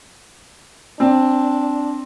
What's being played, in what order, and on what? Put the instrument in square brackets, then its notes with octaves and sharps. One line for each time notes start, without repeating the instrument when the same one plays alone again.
[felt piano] C4 [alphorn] D4